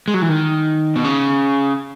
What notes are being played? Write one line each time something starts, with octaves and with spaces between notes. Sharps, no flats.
G#3
F#3
E3
D#3
B2
C#3